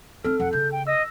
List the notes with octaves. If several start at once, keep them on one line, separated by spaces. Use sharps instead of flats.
C4 D#4 A4 F6
F2 F#5
C#3 G6
G5
D#5 E6 A#6